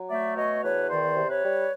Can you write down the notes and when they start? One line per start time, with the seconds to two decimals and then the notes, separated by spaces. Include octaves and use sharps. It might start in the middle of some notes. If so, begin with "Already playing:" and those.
Already playing: F#3
0.09 A3 D5 E5
0.36 B2 C#5 D#5
0.63 E2 B4 C#5
0.89 D#3 C5 D5
1.16 C3
1.29 B4 C#5
1.43 G3